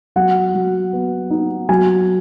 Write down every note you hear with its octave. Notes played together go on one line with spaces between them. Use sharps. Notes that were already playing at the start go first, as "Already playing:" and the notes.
F#3 F#5
F#3
B3
D#4
F#3 G#5